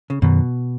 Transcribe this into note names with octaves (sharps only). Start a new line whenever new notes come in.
C#3
F#2 B2 D#3 F#3